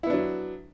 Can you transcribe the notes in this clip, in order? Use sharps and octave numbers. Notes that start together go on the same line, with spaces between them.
F#3 B3 D4 E4